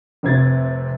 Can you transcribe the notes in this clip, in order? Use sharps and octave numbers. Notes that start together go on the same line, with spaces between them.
F1 C3 G#6 A6